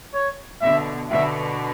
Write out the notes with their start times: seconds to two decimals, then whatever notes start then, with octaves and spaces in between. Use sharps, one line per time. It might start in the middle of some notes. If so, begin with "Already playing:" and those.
0.14 C#5
0.61 B2 D3 E5
1.10 B2 D3 E5